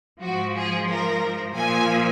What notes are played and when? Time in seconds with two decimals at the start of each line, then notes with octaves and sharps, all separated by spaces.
0.22 G#2 F3 F#4
0.55 G#4
0.88 A#4
1.55 A#2 F3 G#5